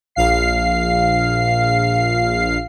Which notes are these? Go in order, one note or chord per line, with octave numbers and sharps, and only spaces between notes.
A#1 F5 C7